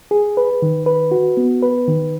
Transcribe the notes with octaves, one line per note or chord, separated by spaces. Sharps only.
G#4
B4
D#3
B4
F#4
B3
B4
D#3